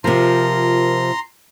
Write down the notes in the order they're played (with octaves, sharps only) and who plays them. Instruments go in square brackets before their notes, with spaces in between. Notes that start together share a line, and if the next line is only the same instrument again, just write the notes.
[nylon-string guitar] C3 F3 [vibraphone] F4 A#4 [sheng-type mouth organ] A#5 C6